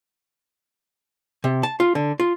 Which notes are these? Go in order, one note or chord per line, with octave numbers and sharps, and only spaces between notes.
C3
A5
F4
D3
F4